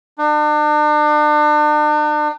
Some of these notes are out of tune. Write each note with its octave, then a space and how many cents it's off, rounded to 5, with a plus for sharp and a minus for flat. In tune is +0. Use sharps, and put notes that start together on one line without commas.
D4 +40